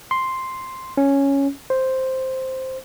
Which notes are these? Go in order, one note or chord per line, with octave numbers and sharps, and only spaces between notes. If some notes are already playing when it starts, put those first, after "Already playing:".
C6
C#4
C5